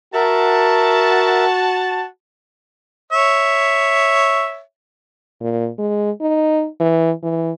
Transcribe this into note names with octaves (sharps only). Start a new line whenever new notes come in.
F#4 A#4 E5 A5
C#5 E5
A#2
G#3
D#4
E3
E3